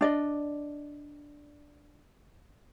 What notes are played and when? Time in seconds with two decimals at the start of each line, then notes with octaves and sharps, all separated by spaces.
0.01 D4 D5 D#5